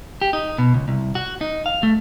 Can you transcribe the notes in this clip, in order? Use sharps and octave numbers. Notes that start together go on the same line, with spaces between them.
G4
D#4
B2
C#2
C2
F#4
D#4
F5
A3